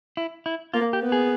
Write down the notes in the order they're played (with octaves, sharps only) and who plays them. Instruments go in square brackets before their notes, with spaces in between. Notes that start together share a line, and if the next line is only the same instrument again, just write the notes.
[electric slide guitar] E4
E4
[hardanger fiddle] A#3 [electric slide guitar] F4
[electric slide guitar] G4
[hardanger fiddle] B3
[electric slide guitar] G#4